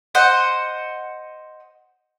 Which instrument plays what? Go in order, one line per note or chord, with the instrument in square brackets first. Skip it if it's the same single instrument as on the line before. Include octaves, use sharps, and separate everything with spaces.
[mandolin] C5 D#5 F#5